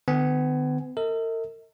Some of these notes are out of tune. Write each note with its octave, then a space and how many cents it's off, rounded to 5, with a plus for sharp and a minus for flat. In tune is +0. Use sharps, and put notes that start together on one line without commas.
D3 +45 B3 +35 G#5 +0
A#4 -45 D#5 +45